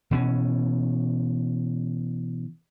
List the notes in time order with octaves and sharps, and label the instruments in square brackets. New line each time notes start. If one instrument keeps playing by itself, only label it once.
[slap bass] B2 E3 C#4